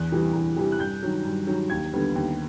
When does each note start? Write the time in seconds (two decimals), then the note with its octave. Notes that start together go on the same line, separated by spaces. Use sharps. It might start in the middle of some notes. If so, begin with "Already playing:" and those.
Already playing: E2 F#6
0.12 C3 E3 G3
0.33 E2
0.56 C3 E3 G3
0.72 F#6
0.79 G2 G6
1.03 D#3 F#3
1.25 G2
1.47 D#3 F#3
1.70 D#2 G#6
1.93 D3 G3 B3
2.15 D#2